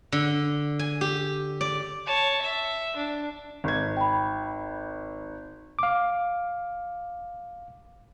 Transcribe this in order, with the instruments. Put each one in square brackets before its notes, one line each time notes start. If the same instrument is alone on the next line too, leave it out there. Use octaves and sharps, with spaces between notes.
[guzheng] D3
G#5
G4
D5
[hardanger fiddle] C#5 A5
E5
D4
[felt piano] G#1 G#6
[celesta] G5 B5
[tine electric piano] F5 D6